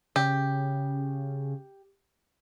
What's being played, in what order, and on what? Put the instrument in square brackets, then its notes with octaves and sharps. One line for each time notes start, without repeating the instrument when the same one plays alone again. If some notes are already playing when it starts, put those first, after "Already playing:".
[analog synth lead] C#3 [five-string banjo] G4